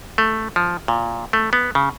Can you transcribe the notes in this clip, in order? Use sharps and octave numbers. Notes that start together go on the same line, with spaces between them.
A3
F3
A#2
A3
B3
C#3